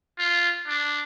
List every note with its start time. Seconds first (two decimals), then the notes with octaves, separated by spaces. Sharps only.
0.19 F4
0.68 D4